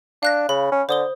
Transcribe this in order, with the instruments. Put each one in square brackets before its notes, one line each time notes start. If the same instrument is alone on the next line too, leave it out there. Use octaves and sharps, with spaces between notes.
[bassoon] D4 [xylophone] F5 F#6 A#6
[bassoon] C#3 [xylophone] B5
[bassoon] C#4
[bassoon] D3 [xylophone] C5 D#6 G7